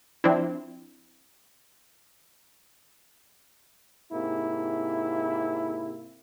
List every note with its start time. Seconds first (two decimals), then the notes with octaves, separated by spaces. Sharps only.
0.24 F3 C4 D4 E4
4.12 G#2 C3 A#3 E4